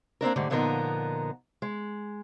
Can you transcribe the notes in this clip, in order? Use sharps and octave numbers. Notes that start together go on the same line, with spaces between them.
A#3 C4 D4 A#4
G#2 D3 G3 A3
A#2 D3 F3 B3 D#4 A#4
G#3